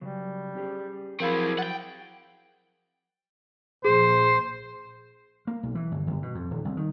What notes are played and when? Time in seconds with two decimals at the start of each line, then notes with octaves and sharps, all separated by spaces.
0.01 C#3 F#3 G3
0.55 C#4 G4 G#4
1.20 F3 F#3 C4 E4 G#4 A#4 F5 B5
1.59 F#5 G5 A6
3.85 A#1 G#4 C5
5.47 A#3
5.63 B1
5.75 E3
5.92 G1
6.07 G1
6.22 B2
6.35 F2
6.51 D#1
6.65 C2
6.77 D#3